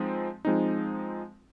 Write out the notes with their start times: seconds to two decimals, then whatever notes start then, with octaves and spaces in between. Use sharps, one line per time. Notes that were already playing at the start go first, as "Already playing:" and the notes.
Already playing: F3 G#3 C4 D#4
0.45 F3 G#3 C4 D#4